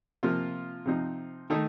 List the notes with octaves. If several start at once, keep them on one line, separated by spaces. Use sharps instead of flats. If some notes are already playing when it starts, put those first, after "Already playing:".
C3 F3 A#3 F4
C3 F3 C4 D#4
D#3 A3 D#4